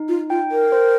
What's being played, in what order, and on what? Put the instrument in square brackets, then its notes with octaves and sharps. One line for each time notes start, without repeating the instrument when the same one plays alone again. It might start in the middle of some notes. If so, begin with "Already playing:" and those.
Already playing: [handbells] D#4
[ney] F4
[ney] F4 [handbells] G5
[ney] A#4
[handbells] C5